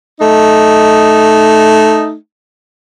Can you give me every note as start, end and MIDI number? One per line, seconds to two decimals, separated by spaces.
0.19 2.14 57
0.19 2.14 63